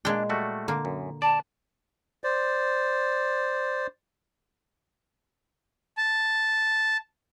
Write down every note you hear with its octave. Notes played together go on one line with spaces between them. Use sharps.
A#2 G#3 D4 G5
G3 A3 F#4
D3 A#3
F#2
D5 A5
C5 D5
A5